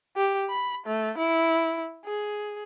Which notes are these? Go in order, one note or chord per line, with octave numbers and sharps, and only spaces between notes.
G4
B5
A3
E4
G#4